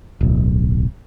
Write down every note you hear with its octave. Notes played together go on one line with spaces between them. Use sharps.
D1 B1